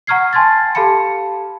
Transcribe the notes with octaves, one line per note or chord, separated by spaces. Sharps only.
F#5 A#5 C#6 F6 G#6 C7
G#5 A5 C6 F6 G#6 A6
G4 A4 F5 A5 B5 C#7